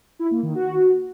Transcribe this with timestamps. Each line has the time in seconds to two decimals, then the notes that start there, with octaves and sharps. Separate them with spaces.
0.19 E4
0.31 A#3
0.43 D#3
0.55 F#4